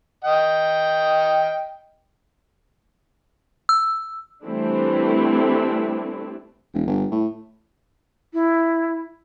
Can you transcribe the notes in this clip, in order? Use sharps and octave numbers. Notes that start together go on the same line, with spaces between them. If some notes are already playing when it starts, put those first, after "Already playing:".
D#5 G5
E6
E3 G3 A3 C4 D4 E4
E1
G1
A2
E4